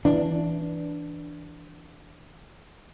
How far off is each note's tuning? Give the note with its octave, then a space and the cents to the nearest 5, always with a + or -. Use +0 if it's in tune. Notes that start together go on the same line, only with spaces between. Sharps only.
E3 +0 D4 -5